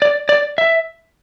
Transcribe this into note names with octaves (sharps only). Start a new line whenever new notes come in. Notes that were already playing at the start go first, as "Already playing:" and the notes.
D5
D5
E5